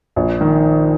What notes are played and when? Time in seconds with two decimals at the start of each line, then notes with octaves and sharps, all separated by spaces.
0.16 A#1
0.41 D#3